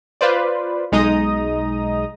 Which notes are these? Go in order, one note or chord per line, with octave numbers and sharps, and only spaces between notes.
F4 B4 C5 D5
B1 G#3 D#4 D#5 A#5 D#6